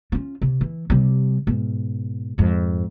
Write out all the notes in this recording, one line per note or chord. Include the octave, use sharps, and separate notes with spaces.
C#4 F4
C3
E3
C3 G3
G#2 B2
F2 G#2